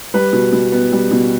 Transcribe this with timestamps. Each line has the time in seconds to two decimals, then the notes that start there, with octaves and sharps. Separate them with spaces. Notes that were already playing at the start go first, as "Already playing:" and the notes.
0.14 G3 B4
0.33 B2
0.53 B2
0.72 B3
0.92 G3
1.11 B2